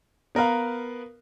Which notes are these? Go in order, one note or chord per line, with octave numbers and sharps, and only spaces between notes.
B3 A#4 B4 F5